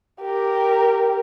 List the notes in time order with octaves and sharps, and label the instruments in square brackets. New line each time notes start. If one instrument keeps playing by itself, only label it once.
[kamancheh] G4 A#4